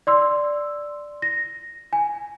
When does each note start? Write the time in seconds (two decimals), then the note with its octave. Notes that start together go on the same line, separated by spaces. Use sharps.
0.07 D5 C6 E6
1.22 A#6
1.93 G#5